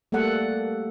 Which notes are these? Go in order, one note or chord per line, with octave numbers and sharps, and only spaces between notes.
G3 A3 A#3 A4 F#5